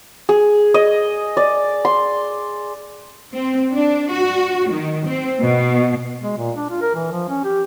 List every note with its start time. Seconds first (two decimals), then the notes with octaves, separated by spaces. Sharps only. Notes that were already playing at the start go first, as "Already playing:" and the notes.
0.29 G#4
0.74 D#5
1.37 D5
1.85 C6
3.33 C4
3.72 D4
4.10 F#4
4.70 D#3
5.06 C4
5.38 B2
6.23 G#3
6.38 A#2
6.56 D4
6.70 F4
6.81 A#4
6.95 E3
7.11 F3
7.29 C#4
7.44 G4